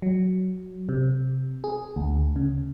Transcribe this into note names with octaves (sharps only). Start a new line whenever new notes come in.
F#3
C3
G#4
D2
C#3